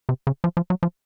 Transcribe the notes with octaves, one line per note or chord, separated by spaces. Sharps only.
C3
C#3
F3
F3
F#3
F3